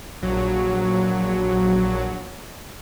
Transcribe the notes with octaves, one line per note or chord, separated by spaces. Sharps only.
A#1 F#3